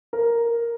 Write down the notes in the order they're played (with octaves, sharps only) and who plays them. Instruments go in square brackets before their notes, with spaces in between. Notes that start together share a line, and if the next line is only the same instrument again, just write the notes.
[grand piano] A#4